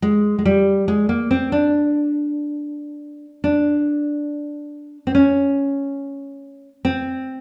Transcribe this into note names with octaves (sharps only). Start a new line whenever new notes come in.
G#3
G#3
G3
G#3
A#3
C4
D4
D4
C4
C#4
C4